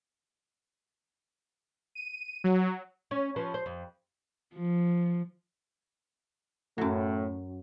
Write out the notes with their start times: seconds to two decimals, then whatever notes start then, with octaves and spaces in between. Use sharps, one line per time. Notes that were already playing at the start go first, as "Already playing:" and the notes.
1.95 D#7
2.44 F#3
3.11 C#4
3.36 F3 C#4 B4
3.54 C5
3.66 F2
4.55 F3
6.78 F#2 A2 F#3 A3